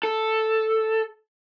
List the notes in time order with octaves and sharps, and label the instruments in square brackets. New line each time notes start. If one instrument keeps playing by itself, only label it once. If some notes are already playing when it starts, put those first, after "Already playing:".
[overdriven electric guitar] A4